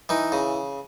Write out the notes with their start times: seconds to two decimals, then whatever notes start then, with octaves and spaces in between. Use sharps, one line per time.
0.09 E3 D#4
0.32 C#3